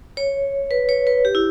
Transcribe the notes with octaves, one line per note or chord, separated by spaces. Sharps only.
C#5
B4
C#5
B4
G4
E4